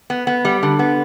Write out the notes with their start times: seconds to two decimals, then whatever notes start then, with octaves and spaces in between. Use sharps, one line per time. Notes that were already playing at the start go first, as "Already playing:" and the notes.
0.10 B3
0.27 B3
0.45 G3
0.63 D3
0.79 B3